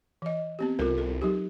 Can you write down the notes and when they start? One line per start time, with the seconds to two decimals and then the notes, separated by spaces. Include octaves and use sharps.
0.22 E3 D#5
0.59 B3 C4 G4
0.79 C2 F4 A4 A#4
0.98 A4
1.22 F#3 D#4 G4